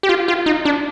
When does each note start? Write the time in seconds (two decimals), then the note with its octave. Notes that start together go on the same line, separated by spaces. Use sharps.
0.03 G4
0.09 F4
0.28 F4
0.46 D#4
0.65 D4